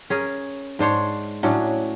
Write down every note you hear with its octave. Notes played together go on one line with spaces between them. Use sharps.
C#4 G#4 A#4
G#2 D4 C5 C#5
A2 F#3 C#4 D4